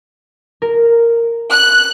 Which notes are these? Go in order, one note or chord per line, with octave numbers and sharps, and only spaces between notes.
A#4
F#6